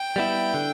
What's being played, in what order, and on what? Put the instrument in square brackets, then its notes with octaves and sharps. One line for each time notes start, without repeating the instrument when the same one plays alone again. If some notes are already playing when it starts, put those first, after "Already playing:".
Already playing: [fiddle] G5
[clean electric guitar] G3 B3 E4
D3